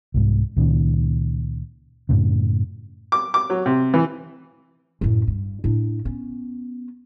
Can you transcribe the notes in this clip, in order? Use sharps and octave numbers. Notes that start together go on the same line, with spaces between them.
C2 G#2
C#2 A#2 D#3 C#4
F#2 A2 C#3
D6
D6
F#3
C3
E3
F#2 A2
G2
A2 D4
B3 C#4